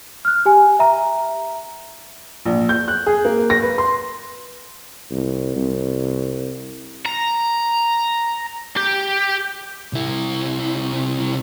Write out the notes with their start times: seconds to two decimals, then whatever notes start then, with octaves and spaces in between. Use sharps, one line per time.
0.25 F6 F#6
0.46 G4 G#5
0.79 E5 A#5
2.45 A#1
2.69 G6
2.88 F#6
3.06 G#4
3.25 A#3
3.50 A#6
3.62 B4
3.78 C6
5.11 C2
5.56 C2
7.05 A#5
8.76 G4
9.93 C2 E4